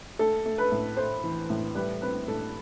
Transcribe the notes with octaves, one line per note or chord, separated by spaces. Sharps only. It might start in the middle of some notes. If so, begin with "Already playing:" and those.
A3 A4
A3
B4
A2
A3 C5
E3
A2
G3 B4
C4 B4
A2 A4